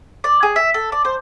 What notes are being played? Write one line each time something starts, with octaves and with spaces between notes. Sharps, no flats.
D5
G#4
E5
A4
D5
C5